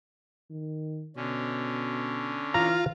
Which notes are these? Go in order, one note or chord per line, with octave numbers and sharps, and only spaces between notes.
D#3
B2 D3 C#4
E3 F4 A#5